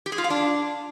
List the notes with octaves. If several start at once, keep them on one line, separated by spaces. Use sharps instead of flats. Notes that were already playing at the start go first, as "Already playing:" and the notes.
G4
G#4
F4
F5
D4